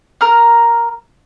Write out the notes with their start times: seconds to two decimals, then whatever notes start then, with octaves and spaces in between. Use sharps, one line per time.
0.21 A#4 A#5 F6